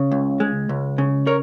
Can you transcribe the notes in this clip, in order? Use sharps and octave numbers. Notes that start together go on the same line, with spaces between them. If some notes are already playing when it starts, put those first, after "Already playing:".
Already playing: C#3
C#2
G#3
C#2
C#3
A#4 C#5